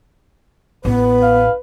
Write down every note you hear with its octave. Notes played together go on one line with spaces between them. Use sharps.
A1 A#3 B3 B4
F5